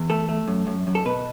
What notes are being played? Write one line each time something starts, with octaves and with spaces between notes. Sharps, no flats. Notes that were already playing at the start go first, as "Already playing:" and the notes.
Already playing: E2
A3 A4
A3
F#2
F#2
F#2
A4
B2 B4